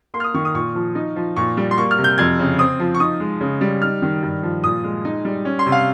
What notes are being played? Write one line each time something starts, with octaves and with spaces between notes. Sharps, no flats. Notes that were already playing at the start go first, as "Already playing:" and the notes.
A#3 C6
F6
D#6
D#3 C#6
D#6
A#2 C#6
F3
D#4
F3
A#2 C#6
G3
C6
A#3 C#6
F6
C3
G6
F2 G#6
C#3
C4 D#6
F3
C#6
D#4 D#6
G#3
C#3
G3
D#4 F6
D#3
G2
F3
A#2 D#6
G#3
D#4
G3
C#4
C6
C3
F5